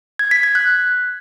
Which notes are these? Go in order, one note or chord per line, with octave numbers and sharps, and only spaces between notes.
G#6
B6
G#6
F#6